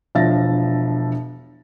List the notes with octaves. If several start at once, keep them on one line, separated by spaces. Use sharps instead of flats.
E1 F3 D4 E5 A6 A#6